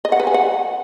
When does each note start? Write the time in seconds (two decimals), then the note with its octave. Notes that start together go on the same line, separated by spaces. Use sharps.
0.05 D#5
0.12 F#5
0.20 B4
0.27 G#5
0.34 F#5